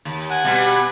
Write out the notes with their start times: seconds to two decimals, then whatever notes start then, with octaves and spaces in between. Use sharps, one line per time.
0.05 D#2
0.30 F#5 G#5
0.44 B2 G3